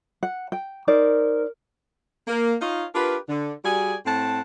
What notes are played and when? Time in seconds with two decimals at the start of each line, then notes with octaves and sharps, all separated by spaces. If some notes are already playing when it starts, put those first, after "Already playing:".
0.23 F#5
0.52 G5
0.87 D#4 A#4 C5 D5
2.27 A#3
2.61 D#4 F4 C#5 D#5 F5
2.94 D4 F4 G4 A#4 B4
3.29 D3
3.64 G3 F#4 G#4 D5 G#5
4.06 A2 C4 F#5 A5